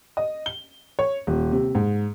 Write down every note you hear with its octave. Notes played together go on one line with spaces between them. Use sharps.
D#5
G7
C#5
D#1
C3
G#2